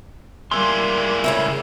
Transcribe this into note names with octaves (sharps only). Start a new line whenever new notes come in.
G3 G#3 A#3 E4 C6
A2 C#3 E5